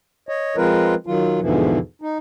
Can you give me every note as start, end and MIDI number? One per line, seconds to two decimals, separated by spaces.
0.29 0.56 73
0.29 0.56 75
0.56 0.95 53
0.56 0.95 56
0.56 0.95 60
0.56 0.95 65
0.56 0.95 70
0.56 0.95 71
1.07 1.40 51
1.07 1.40 54
1.07 1.40 65
1.41 1.79 40
1.41 1.79 44
1.41 1.79 47
1.41 1.79 50
1.41 1.79 52
1.41 1.79 53
2.02 2.18 63